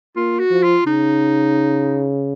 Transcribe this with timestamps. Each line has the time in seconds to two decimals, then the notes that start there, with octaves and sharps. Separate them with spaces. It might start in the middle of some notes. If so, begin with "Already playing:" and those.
0.16 A#3 F4
0.39 F#4
0.51 F3
0.63 F4
0.86 C#3 D#4